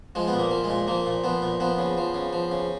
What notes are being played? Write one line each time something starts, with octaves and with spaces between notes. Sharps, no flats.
F3 G#3
B3
A#2
A#3
F3
G#3
A#2
F3 A#3
A#2
F3 B3
A#2
F3 B3
C#3
F3
C#3
F3
C#3